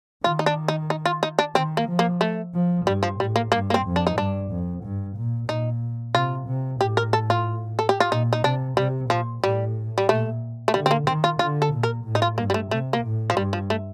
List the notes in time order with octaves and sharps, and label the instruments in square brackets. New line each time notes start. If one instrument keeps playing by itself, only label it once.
[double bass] D#3 [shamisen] F4
[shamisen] D#4
D4
D#4
D#4
F4
D#4
D4
[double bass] D#3 [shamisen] C4
[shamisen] A#3
[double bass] F3
[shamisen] A#3
A3
[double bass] F3
[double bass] G2 [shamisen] G3
[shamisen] F3
[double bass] A2 [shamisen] G3
[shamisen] A#3
[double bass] G2 [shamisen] A#3
[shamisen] A#3
C4
[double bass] F2
[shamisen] D4
D#4
[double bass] G2 [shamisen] D4
[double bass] F2
G2
A#2
[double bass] A#2 [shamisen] D#4
[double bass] C3 [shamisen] F4
[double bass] C3
[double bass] A2 [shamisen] G4
[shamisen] A#4
A4
F4
A4
G4
F4
[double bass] A#2 [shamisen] D#4
[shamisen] D#4
[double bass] C3 [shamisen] D4
[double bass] C3 [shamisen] G3
[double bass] A#2 [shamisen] F3
[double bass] A2 [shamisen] G3
[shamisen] G3
[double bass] A#2 [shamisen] A3
[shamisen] A3
[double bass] D3 [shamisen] G3
[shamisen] C4
A#3
[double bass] D#3 [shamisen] C4
[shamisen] F4
[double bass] D3 [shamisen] F4
[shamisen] A4
[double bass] A#2
[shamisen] A#4
[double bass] A2
[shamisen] D#4
F4
[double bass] G2 [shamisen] A#3
[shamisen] G3
A3
[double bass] C3 [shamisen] A3
[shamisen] A#3
[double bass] A2
[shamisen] F3
[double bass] G2 [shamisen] G3
[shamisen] F3
A3